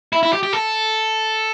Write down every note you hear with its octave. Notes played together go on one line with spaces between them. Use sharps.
E4
E4
G4
G4
A4